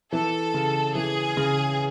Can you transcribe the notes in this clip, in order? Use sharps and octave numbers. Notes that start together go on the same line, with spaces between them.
E3 A4
C#3
E3 G#4
C#3